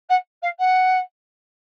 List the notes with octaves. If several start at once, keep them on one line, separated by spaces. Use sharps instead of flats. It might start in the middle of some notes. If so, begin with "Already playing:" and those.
F#5
F5
F#5